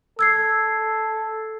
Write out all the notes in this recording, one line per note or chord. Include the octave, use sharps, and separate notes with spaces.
A4 E6 G#6 C7